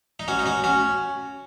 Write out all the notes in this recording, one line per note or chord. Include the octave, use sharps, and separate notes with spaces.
D#4
C#4 F#4
D#4
C#4 F#4
C#4 F#4